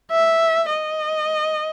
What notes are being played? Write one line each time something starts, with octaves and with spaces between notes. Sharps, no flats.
E5
D#5